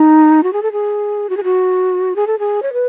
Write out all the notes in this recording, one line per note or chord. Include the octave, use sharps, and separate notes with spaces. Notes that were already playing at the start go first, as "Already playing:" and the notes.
Already playing: D#4
F#4
G#4
A4
G#4
F#4
G#4
F#4
G#4
A4
G#4
C#5
B4